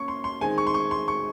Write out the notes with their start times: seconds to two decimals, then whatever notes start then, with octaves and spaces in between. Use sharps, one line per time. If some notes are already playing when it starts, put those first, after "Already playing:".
Already playing: A#3 C#4 C#6
0.08 C6
0.24 C6
0.41 D#3 G#3 C4 G#5
0.58 C#6
0.67 C6
0.74 C#6
0.91 C6
1.08 C#6